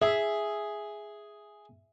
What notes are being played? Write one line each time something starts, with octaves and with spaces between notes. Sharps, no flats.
G#4 E5